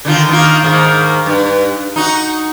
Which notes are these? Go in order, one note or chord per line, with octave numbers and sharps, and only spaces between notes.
D3 D#3 F4
D#3 A#3 F4
G#2 D#3 A#3
G2
D#4 F#4